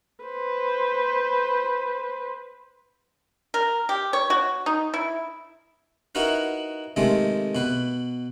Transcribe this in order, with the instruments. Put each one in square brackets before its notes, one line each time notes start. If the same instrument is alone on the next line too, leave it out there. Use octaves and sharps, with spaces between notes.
[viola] B4 C5
[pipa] A#4
G4
C#5
F#4
D#4
E4
[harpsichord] D#4 E4 F#4 A#4 B4
C3 D#3 G#3 A3 C4
B2 B4